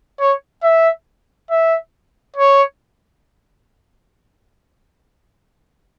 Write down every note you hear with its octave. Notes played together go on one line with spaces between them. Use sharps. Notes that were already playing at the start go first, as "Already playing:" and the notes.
C#5
E5
E5
C#5